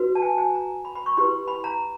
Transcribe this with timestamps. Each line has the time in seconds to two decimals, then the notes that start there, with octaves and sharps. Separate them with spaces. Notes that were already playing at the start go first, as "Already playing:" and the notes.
Already playing: F#4 B4
0.15 A5
0.22 G#5
0.38 G#5
0.55 A#5
0.85 B5
0.95 B5
1.06 C#6
1.17 E4 G4 B4 C6
1.48 B5
1.64 A#5